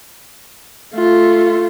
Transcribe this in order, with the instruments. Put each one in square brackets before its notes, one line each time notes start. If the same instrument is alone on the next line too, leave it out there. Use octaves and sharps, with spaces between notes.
[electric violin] A3 F4